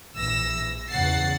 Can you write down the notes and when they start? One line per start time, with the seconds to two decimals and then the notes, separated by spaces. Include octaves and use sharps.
0.15 A#1 E3 E6 A#6
0.89 E2 C#3 F#5 A6 C7